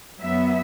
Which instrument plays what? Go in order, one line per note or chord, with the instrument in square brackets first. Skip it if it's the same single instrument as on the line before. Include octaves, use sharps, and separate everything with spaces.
[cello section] F#2 F#3 B3 E5